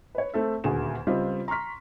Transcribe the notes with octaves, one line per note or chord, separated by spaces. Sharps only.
B4 C#5
A3 C4 A4 E5
D#1 D2 F#4 G#4 E7
C#2 G3 C4 F4 D#5
A#5 C6 C#6 F6 B6